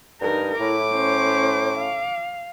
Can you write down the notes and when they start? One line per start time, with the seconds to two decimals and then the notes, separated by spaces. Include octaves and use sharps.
0.21 G2 D#4 A#4
0.60 A2 E4 D6
0.94 C#4 C5
1.78 F5